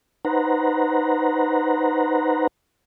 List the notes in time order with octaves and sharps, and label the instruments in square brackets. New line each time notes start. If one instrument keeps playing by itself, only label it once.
[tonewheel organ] D#4 B4 C5 F#5 A#5